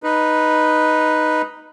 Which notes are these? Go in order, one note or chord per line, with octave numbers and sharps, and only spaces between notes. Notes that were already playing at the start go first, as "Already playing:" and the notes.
D#4 B4